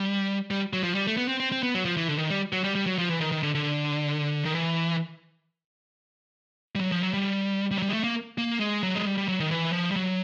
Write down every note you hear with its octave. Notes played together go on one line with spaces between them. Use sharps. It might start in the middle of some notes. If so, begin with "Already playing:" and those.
Already playing: G3
G3
F#3
F3
G3
A3
B3
C4
C4
C4
B3
F#3
F3
E3
D3
D#3
G3
F#3
G3
G3
F#3
F3
E3
D#3
D#3
D3
D3
D#3
E3
G3
F#3
F3
F#3
G3
G3
F#3
G3
G#3
A3
A#3
A#3
G#3
F#3
G#3
G3
G3
F#3
D#3
E3
F3
G3
F#3